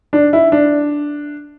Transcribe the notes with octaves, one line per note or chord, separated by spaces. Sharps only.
D4
E4
D4